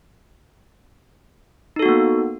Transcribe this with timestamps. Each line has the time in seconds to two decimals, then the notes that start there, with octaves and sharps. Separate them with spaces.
1.76 D#4
1.79 A4
1.82 F#4
1.86 B3
1.89 A#3